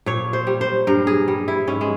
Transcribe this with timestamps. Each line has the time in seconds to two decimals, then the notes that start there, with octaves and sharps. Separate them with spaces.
0.06 A#2 C#5
0.33 C5
0.47 G3
0.61 C5
0.87 G2 A#4
1.07 G#4
1.28 G3
1.48 E4
1.67 G#2 C#4
1.81 G#3